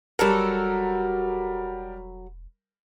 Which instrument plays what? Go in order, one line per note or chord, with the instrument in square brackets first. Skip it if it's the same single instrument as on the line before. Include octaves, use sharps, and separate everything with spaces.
[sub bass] E1 [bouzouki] F#3 F#4 A4 [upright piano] G3 A#4